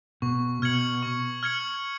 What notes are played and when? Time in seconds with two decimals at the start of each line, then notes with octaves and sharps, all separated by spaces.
0.22 B2 C#6
0.62 B2 F6 G#6 C#7 F#7
1.03 C#6
1.43 F6 G#6 C#7 F#7